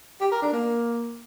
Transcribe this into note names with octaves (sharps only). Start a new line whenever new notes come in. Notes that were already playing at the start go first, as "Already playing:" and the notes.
G4
A#4
D4
A#3